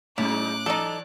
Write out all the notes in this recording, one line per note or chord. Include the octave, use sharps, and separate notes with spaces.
A2 F#3 G#3 C#4 D#4 E4 D6 F#6
E3 D#4 A4 D5